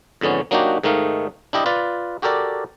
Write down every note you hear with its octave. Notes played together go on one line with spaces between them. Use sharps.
F2 G#2 D3 B3 C#4
F#3 A#3 D4 D#4 F#4 G4
G#2 D#3 A3 D#4 F5
D4 E4 G4 D#5
F4 B4 D5
F#4 G4 A4 A#4 D5